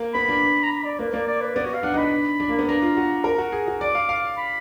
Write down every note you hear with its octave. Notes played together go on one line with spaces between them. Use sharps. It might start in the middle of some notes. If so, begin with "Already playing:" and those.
Already playing: A#3
B3 B5
D4
A#5
B5
D5
A#3 B4
A#3 D5
D5
B4
B3 D5
F#4
F5
D4 F#5
D#4 B5
D4
D4
A#3
B3
D4 A#5
F4
F#4
A#4
F#4
G#4
F#4
D5 D6
F5
F5
B5